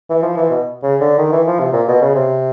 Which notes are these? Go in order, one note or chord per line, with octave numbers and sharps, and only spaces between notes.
E3
F3
E3
B2
C#3
D3
D#3
E3
F3
C3
A#2
B2
C#3
C3